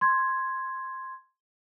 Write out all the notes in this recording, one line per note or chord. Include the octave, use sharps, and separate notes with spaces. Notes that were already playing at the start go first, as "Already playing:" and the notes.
C6 G#6